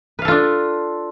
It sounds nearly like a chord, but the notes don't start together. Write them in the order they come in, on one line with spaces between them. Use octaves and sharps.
B4 F5 A4 F4 D4